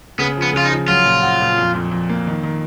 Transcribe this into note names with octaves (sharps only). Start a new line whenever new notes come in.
C#3 B3
F3
B3
C#3 F4
D#4
F3
F#3 F4
A#2
F#4
A#2
F2
F2
F2
A#3
D#3
D#3